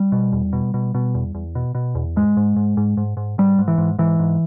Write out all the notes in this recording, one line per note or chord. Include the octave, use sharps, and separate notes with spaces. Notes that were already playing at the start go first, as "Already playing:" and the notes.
Already playing: G3
B2
E2
B2
B2
B2
E2
E2
B2
B2
E2
G#2 G#3
G#2
G#2
G#2
G#2
G#2
G#2 G3
G#2
E3
G#2
G#2 E3
G#2